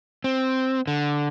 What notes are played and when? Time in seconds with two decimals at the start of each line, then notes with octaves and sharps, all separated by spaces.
0.24 C4
0.87 D3